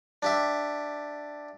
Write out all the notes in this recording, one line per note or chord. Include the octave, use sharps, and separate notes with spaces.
D4 G4 E5